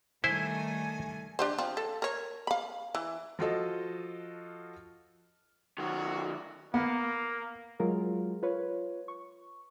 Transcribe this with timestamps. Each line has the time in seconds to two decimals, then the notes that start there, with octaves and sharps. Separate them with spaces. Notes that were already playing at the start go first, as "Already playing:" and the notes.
0.24 D#3 G3 A3 E4 C5 G#5
1.39 D4 G4 C5
1.58 F3 C4
1.77 A4
2.02 A#4 C#5
2.47 F5 B5
2.95 E3
3.39 F3 F4 F#4 A4 D#5
5.78 D#3 F#3 F#4
6.74 A#3 B3
7.80 F#3 G#3 F4 G#4 A#4
8.43 F4 B4 C#5
9.08 C#6